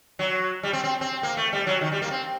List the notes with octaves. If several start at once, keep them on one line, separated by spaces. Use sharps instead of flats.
F#3
G3
C4
C4
C4
A#3
A3
G3
F#3
D#3
G3
A#3
C4